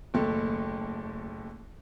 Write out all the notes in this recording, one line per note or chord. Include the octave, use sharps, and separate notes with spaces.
F#1 D#2 A3